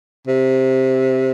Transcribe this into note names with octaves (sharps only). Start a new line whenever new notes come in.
C3